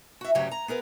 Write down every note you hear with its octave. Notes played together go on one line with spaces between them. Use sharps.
F#4 E5
D2 G2 C#3 F#3 G4 C#5
A#5
B3 G#4 A#4 B4